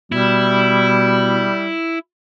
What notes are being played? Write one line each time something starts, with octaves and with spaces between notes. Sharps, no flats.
B2 G3 E4